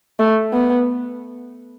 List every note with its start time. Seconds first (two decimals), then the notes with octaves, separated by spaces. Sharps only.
0.19 A3
0.53 B3